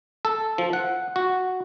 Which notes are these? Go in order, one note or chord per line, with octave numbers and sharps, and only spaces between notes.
A4
F3
F#5
F#4